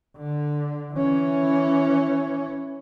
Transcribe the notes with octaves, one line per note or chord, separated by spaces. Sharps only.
D3
E3 C#4